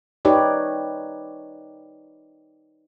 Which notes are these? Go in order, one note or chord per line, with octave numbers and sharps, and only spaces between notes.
D#4 G4 B4 C#5 D5